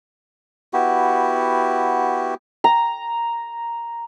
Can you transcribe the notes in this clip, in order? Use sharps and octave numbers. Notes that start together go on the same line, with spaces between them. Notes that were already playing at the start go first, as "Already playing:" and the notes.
B3 E4 F#4 G4
A#5